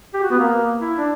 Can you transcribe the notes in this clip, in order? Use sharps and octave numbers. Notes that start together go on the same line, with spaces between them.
G4
F#4
B3
A#3
E4
D4